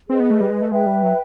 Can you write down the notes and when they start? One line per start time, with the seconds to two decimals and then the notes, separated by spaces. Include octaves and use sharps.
0.09 C4 G#4 B4 D#5
0.20 B3
0.30 A3
0.41 G3
0.50 G#3
0.61 A3
0.71 G#3 B4 E5 G5
0.86 G3
1.03 F#3